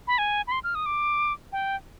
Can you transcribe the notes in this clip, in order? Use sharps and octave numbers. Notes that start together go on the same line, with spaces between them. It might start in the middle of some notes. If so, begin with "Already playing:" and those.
B5
G#5
B5
C6
F6
D#6
D6
G5